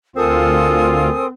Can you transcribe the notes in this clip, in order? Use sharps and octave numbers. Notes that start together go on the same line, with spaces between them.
D2 C4 F4 A4 A#4 G#5 D#6